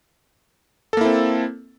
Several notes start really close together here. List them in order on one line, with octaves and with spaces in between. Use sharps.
A4 A#3 E4 C4